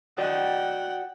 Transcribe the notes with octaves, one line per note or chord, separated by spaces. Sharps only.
F#4 D5 D#5 F#5 G5